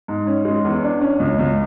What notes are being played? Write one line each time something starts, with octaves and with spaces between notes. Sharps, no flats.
G#2
C#4
G#3
E2
D4
C#4
C#2
C#2